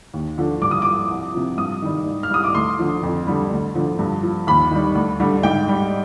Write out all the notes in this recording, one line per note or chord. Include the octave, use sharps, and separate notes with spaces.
D#2
D3 F3
G2 D6
D#6
F3 D6
C2
C3 F3
G2 D#6
D#3 G3
G#2
F6
G3 D#6
D6
D2 C6
D3 F3
F2
D3 G3
D2
D3 F3
G2
F3
D#2 B5
D#3 G3
D2
D3 G3
G#2 G5
G3